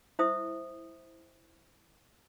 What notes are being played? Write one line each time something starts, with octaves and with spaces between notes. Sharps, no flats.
E4 C5 E5 D#6